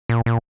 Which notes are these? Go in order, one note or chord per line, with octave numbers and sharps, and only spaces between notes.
A#2
A#2